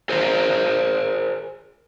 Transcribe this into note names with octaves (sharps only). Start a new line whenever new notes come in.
G#4 A#4 C5